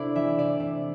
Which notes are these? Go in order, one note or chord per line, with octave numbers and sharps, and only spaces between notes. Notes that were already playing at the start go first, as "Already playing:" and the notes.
Already playing: C3 A3 D4 E4 D5
E3 E5
C3 D5
C3